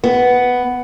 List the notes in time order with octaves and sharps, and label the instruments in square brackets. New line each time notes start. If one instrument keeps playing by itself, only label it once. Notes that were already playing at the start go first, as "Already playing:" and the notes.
[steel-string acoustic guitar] B3